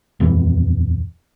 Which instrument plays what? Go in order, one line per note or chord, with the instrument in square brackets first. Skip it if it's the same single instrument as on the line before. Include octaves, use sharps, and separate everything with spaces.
[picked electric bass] D#1 F2 E3